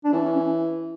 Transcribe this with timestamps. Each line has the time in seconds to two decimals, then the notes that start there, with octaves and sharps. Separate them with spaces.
0.04 D4
0.13 E3 C#4
0.25 C#4
0.36 C#4